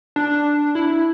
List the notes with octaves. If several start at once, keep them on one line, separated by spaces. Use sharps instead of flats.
D4
E4